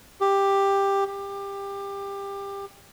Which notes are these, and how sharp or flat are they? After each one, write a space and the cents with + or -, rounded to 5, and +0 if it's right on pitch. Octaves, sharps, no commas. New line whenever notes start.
G4 +10
G4 +20